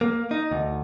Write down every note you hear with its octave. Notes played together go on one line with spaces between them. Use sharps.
A#3
D#4
D2